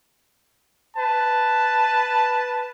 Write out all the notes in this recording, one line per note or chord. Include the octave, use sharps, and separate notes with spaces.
B4 A5